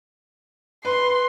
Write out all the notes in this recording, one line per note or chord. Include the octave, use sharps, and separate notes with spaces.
B4 C6